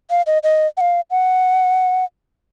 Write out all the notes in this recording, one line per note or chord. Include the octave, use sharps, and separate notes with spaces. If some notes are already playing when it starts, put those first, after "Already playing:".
F5
D#5
D#5
F#5
F5
F#5